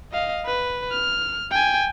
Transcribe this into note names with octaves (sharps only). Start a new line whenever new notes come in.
D#5 F5
B4
F6
G5 G#5